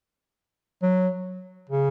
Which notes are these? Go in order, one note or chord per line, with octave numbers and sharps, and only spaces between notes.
F#3
C#3